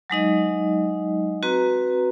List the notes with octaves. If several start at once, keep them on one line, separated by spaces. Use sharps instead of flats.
F#3 G#3 D#4 D#5
C4 F#4 B4 A#5